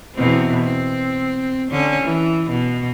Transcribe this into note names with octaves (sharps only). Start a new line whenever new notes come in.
E2 B2 C4
C4
D3 C#4
E3
B2